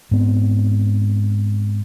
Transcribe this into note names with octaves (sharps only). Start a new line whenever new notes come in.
G#2 B3 C4